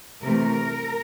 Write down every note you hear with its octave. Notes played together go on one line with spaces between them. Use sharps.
C3 E3 A3 A#4